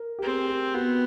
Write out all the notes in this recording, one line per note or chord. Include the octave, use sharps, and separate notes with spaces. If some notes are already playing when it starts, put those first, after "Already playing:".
Already playing: A#4
G4
C4 G#4
G4
B3 F#4